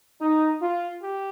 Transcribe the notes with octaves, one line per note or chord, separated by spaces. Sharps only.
D#4
F4
G4